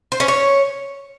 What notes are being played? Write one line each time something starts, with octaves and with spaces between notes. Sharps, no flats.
C5
C#4
C#5